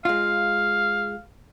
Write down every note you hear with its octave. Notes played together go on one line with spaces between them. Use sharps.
G#3 F4 F5